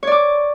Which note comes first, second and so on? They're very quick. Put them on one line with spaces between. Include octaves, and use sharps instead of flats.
C#5 D5 D6